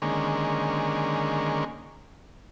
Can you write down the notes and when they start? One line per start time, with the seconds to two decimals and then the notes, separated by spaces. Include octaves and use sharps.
0.02 D3 D#3 G#3 A#3 C#4